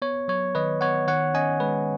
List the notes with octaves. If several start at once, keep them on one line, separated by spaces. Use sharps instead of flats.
B3 C#5
F#3 C#5
D#3 B4 D#5
B3 C#5 F#5
D#3 C#5 F#5
C#4 D#5 G#5
G#3 B4